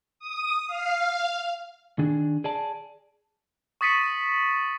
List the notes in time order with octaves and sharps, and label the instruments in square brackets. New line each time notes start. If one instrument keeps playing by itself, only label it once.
[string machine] D#6
F5
[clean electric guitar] D#3 D4 G#4
G#4 D5 A5
[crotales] C#6 D#6 A6 B6 C#7 D#7